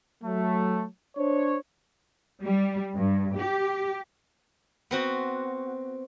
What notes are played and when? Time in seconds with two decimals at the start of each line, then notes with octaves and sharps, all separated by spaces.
0.24 F#3 A3
1.17 D4 C5 C#5
2.43 G3
2.95 G2
3.37 G4
4.91 B3 C4 F#4